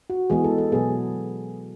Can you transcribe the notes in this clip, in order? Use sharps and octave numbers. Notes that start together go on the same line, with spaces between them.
F#4
E3 G#3 B3 G#4
A4
A4
B2 F#3 B3 G#4